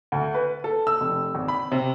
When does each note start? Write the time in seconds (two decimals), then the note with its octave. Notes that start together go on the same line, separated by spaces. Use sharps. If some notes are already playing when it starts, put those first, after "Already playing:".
0.12 D2
0.34 B4
0.64 A4
0.87 E6
1.00 F1
1.35 G#1
1.48 B5
1.72 C3